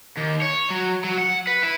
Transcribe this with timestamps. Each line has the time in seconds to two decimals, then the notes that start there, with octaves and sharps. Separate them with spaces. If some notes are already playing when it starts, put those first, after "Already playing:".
0.18 D#2
0.42 C#5
0.70 F#3
1.04 F#3
1.18 F#5
1.47 B4
1.63 E4